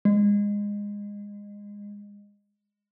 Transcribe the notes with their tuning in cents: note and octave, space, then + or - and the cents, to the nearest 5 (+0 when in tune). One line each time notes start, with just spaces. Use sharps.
G#3 -20